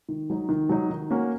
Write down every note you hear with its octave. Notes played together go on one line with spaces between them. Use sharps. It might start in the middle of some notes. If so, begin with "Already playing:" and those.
D#3
F#3 D#4
D#3
F#3 D#4
D#3
A#3 C#4 F#4